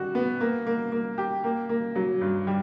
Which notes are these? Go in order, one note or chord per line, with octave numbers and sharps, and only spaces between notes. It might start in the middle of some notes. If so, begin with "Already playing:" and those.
Already playing: G3 F#4
B3
A#3
A#3
A#3
G4
A#3
A#3
F#3
G2
G3